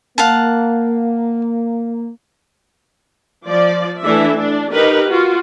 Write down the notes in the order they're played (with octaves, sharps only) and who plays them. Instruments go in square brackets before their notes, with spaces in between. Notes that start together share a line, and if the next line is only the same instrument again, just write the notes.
[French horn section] A#3 [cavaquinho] F5 F#5 A5
[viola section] F3 D5
E3 A3 D4 E5
D4
D#4 G4 A#4 B4
F4 F#4